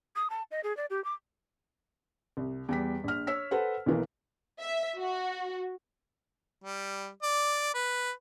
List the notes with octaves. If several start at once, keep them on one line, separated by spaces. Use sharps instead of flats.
D#6
A5
D#5
G#4
D5
G4
D6
C2
E2 G3 B6
A#1 F6
C#5 E6 B6
A4 B4 C5 F#5
B1 E3 A#3
E5
F#4
G3
D5
B4